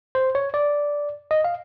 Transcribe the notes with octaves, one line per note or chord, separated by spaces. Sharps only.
C5
C#5
D5
D#5
F5